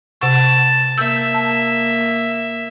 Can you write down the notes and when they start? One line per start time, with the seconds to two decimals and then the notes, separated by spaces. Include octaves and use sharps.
0.21 C3 F#5 A5 C#6
0.98 A#3 E5 E6 G6
1.34 A5